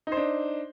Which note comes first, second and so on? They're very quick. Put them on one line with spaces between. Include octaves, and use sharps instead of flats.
D#4 C5 D4